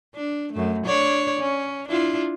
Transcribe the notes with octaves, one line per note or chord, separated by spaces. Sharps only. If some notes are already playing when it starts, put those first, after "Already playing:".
D4
F#2 A3
D4 C#5 D5
C#4
D4 E4 F4